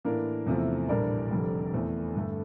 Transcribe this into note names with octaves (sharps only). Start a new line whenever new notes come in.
A2 E3 A#3 D4 A#4
E2 C3 F3 A3 E4
A#1 A2 E3 G3 D4 A#4 D5
F1 F2 D3 G3
E2 E3 A3 C4
G2 D3 A3